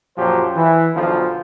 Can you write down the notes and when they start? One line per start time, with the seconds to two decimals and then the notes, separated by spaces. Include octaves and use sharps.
0.18 F#2 A#2 F3 F#3 G4 C5
0.56 E3
0.95 B1 D3 F3